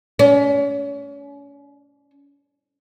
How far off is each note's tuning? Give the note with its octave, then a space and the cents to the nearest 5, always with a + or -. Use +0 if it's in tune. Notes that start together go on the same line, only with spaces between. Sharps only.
C#4 +35